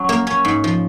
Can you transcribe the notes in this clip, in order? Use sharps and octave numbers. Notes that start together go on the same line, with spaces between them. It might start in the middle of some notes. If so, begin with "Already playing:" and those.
Already playing: F#3 C#4
A#3
C#4
G#2
F3